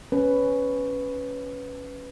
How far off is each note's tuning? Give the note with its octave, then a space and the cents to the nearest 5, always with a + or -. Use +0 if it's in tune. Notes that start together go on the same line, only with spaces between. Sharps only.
C#4 +5 B4 +5